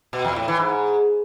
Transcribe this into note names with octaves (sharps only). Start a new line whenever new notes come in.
B2
E2
A2
E3
G#2